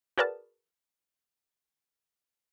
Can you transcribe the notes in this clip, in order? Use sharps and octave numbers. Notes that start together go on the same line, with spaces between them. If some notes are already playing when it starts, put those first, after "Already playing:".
F#4 G#4 A#4 B4 D5 A5